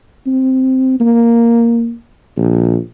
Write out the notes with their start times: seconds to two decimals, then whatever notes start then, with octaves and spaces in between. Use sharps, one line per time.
0.27 C4
1.00 A#3
2.37 A#1